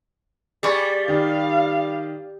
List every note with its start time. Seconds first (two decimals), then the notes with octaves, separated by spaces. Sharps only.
0.63 G3 G#4 D5 C#6
1.08 D#3 G4 F5